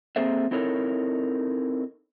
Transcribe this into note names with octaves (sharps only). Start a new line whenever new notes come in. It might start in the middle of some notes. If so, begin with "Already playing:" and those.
A#3 C4 G#4 A4 C5 E5
C4 D#4 E4 A4 A#4 C#5